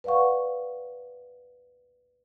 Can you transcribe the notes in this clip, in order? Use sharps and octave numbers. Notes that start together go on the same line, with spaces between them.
B4 D5 F5 F#5 C#6